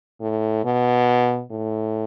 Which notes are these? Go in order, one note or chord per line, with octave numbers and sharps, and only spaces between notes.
A2
B2
A2